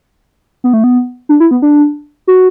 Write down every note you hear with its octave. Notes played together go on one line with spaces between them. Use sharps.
B3
A3
B3
D4
E4
B3
D4
F#4